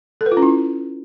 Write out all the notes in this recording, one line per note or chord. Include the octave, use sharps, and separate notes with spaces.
A4
B4
F4
C#4
E4